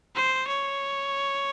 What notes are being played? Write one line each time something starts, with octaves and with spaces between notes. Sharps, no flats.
C5
C#5